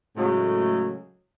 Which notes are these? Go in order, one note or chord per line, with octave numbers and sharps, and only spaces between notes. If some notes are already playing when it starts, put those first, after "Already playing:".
A2 C#3 F#3 G#3 A3